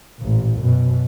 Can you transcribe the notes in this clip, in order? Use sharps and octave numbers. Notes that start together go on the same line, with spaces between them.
A1 A#2
F#2 B2